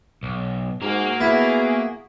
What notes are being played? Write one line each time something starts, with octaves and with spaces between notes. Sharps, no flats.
B1
G#2 A#3 F#4 G#4 A#4
B3 E4